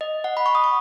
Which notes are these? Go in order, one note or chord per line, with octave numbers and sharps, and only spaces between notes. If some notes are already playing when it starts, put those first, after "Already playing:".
D#5
F#5
B5
C#6
D#6
C#6